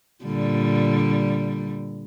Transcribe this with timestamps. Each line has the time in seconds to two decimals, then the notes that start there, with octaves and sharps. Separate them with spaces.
0.24 A#2 D3 G3